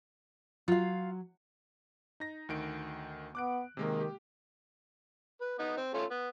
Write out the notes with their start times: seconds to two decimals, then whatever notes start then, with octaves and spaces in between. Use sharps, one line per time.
0.68 F#3 F4 F5
2.20 D#4 A#6
2.49 D2 D#3 D7
3.35 B3 D6 F#6 D7
3.77 C3 D#3 G#3 A#3
4.00 G4
5.41 B4
5.59 B3 D#4
5.77 C4
5.94 A3 C#4 F4
6.11 B3